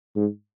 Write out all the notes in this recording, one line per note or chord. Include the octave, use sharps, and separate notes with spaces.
G#2